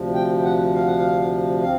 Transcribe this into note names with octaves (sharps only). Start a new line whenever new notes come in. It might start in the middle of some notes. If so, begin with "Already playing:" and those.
Already playing: D2 C3 F3
G5
F#5
F5
F#5
F5
C4 F5